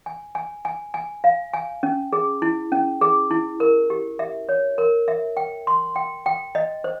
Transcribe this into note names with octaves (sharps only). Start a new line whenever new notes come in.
G#5
G#5
G#5
G#5
F5
G#5
C#4
G#4
E4
C#4
G#4
E4
A#4
G4
E5
C#5
A#4
E5
G5
C6
G5
G5
D#5
C5